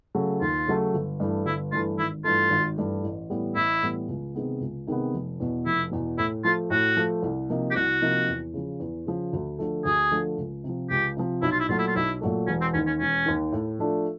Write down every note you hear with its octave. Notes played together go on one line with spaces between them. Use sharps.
C#3 F#3 A3
D#2 F4
C#3 F#3 A3
G1
G2 E3 A3
G1 E4
G2 E3 A3 F4
G#1 E4
G2 E3 A3 F4
G#1
G2 E3 A3
A1
A2 E3 G3 B3
A1 E4
A2 E3 G3 B3
C#2
C3 D#3 G#3 B3
C#2
C3 D#3 G#3 B3
F1
E2 B2
F1 E4
E2 B2
A2 E4
F3 A3 F4
A2 F#4
F3 A3
C2
C3 F3 A#3 D#4
G4
C2 F#4
C3 F3 A#3 D#4
E2
C#3 F3
E2
C#3 F3
D2
D3 F3 A3
D2 G#4
D3 F3 A3
C#2
C3 F3
C#2 G4
C3 F3
B1 E4
F4
E4
A#2 F#3 A3 F4
E4
F4
B1 E4
A#2 F#3 A3
E1 C#4
C4
D#2 D#3 C#4
C#4
E1 C#4
D#2 D#3
A2
F3 A3 D4 F4